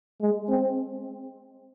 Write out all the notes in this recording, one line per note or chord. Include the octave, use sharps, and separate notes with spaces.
G#3
C4